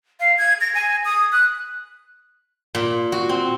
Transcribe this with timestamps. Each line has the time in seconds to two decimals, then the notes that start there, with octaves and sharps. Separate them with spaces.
0.20 F5
0.38 G#6
0.61 A#6
0.75 G#5
1.05 D#6
1.32 F#6
2.75 A#2
3.12 F#4
3.29 C4